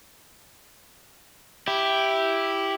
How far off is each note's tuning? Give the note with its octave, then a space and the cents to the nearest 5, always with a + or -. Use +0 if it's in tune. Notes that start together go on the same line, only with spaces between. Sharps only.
E4 +0 G4 +0